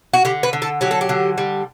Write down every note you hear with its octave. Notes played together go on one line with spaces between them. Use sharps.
F#4
D3 G4
B4
D3
A4
F#3 G4
A4
G4
D3
G3